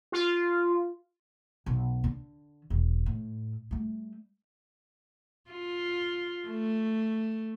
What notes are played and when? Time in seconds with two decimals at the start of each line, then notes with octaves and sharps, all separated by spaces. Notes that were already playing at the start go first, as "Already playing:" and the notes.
0.12 F4
1.66 B1
2.04 D3
2.70 E1
3.06 A2
3.71 G3 A3
5.51 F4
6.46 A3